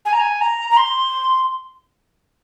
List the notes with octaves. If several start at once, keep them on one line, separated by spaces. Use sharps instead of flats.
G#5
A#5
G#5
A#5
A#5
C6